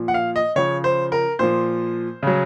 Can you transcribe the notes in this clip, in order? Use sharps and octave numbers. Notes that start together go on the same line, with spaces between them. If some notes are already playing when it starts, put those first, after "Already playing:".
Already playing: A#2 F3
F#5
F5
D#5
C#3 F3 C#5
C5
A#4
A#2 F3 C5
C#3 F#3